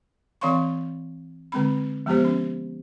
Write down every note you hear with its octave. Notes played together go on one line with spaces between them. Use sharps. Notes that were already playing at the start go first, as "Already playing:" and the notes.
E3 C4 C#5 F5 C6 C#6
D3 G#3 C4 B5
F3 G#3 B3 G4 C5
C#4